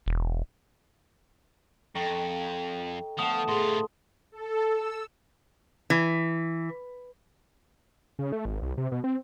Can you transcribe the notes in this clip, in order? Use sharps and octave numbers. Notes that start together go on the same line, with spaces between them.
E1
F2 A4 D#5 G5 A#5 C#6
D3 F3 A3 B3 A5 D#6
A2 F4 G#4 C5 C6
A4
E6
E3
C#3
A3
G#1
C2
C3
B2
C4